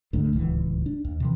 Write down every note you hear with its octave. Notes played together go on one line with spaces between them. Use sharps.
D2 G#2 A3 D4
D1 C#2 E3
D4
D#2
C3 E3